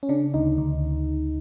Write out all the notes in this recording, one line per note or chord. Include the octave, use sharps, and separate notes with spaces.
C#4
C#3 D4
D2 D#4
D2